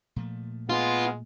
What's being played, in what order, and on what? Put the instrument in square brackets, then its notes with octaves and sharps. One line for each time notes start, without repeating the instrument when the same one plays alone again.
[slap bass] A#2 F3 A3
[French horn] G#3 [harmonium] B3 [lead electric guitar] F4